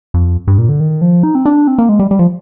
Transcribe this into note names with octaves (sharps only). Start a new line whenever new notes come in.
F2
G2
A#2
D3
D#3
F3
D#4
C4
D4
C4
A#3
G#3
G3
G3
F3